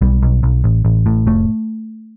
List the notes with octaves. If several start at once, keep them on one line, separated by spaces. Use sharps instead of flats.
B1 G3
B1
B1
A1
A1
A2
F1 A3